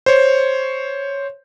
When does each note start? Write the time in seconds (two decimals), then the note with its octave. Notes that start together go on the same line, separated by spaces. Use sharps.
0.06 C5 C#5